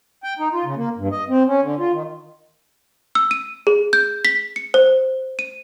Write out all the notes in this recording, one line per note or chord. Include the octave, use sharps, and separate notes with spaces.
G5
D#4
F4
C#3
A#3
G2
D#5
C4
C#4
D3
F4
D#3
E6
D#7
G#4
G6
B6
C#7
C5
D#7